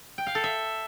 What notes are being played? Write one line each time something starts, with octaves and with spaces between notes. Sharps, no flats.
G5
F5
A4
E5